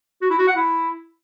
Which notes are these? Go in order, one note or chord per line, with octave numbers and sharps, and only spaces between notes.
F#4
E4
F#4
F#5
E4